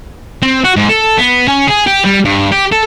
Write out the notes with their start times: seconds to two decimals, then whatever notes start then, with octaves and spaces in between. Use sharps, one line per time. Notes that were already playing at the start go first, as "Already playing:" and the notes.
0.42 C4
0.64 F#4
0.76 G#2
0.89 A4
1.18 B3
1.48 C#4
1.68 G#4
1.87 G4
2.05 G3
2.25 G2
2.52 G4
2.72 A4